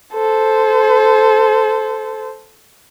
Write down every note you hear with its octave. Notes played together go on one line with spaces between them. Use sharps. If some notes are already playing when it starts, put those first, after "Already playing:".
A4 C5